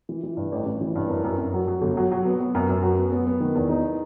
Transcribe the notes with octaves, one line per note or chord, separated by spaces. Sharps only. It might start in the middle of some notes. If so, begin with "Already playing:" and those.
E3
E3
G2
A1
A1
E3
G2
F#2
F#2
F#2
F#3
F#3
G1
F#3
F#3
B3
B3
F#2
F#2
F#3
B3
B3
B3
D#3
E2
D#4